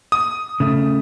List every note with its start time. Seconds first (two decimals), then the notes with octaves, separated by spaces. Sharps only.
0.12 D#6
0.60 C#3 A3